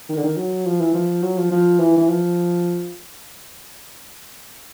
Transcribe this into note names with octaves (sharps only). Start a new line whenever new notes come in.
D#3
D3
D#3
F#3
F3
E3
F3
F#3
F3
F3
E3
E3
F3